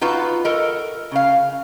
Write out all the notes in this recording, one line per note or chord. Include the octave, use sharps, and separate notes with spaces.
D#4 F4 F#4 B4
A4 A#4 D#5
C#3 F5